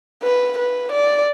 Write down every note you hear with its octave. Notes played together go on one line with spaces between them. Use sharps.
B4
B4
D5